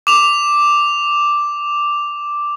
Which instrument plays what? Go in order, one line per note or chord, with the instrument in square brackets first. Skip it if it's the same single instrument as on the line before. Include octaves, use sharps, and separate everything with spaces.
[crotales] D6 F7